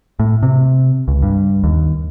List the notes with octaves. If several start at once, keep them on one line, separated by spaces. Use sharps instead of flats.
A2
C3
C#2
G2
D#2